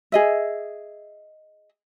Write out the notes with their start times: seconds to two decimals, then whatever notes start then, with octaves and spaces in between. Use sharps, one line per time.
0.12 G#4 D#5 E5